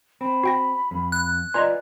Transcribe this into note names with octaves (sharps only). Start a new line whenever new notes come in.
C4 B5
F#4 G5 A#6
F2
F#6
F4 B4 D5 D#5 G#5 A#5 C6